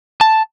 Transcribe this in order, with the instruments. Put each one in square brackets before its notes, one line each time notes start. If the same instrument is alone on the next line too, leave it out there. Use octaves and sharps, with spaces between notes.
[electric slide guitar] A5